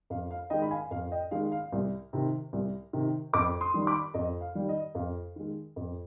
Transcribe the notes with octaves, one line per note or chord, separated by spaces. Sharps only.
F2 F5
F5
D#3 G#3 D#5 G5
B5
F5 G#5
F2 F5
D#5 G5
D#3 G#3 F5
F5
C2
C3 D#3
C2
C3 D#3
F2 B5 D6
C6 D#6
D#3 G3
C6
B5 D6
F2 D#5
F5
D#3 G3
D#5
F2 F5
D#3 G#3
F2